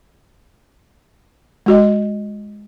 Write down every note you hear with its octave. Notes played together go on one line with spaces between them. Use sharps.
G#3 F#4 D#5